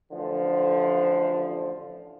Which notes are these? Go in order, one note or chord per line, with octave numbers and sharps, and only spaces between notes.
A1 D3 F3